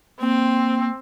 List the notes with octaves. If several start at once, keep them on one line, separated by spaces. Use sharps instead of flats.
A#3 C4